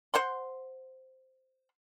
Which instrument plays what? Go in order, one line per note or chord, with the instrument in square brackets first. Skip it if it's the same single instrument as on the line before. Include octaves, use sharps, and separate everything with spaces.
[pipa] C5 F#5 C6